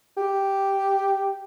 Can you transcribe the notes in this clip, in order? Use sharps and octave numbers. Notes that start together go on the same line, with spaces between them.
G4